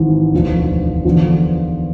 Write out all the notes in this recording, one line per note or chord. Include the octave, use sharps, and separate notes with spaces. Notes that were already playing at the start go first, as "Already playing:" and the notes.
Already playing: G#1 G#2 E3
E1 D2 D3 F3
E2 D3 F3